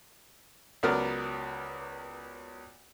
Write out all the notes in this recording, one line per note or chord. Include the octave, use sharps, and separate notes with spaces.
C#2 F#3 B3 A#4 D5 F6